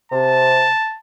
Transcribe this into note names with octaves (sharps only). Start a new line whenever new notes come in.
C3 A5